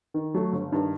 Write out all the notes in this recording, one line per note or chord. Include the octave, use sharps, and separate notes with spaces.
D#3
F#3 A3
G1
G2 D#3